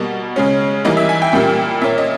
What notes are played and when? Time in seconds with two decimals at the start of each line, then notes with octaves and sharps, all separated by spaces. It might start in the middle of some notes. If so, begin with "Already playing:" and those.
Already playing: B2 G3 A#3 D#5
0.36 C#3 G#3 C#4
0.85 E3 G3 A#3 D#4 D#5
0.97 E5
1.09 G#5
1.22 G5
1.33 A#2 G3 A#3
1.82 A#2 A#3 C#4 E5
1.98 D#5